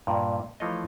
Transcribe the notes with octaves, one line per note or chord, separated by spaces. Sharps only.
G2 A#2
E3 F3 A3 F4 C#5 D#5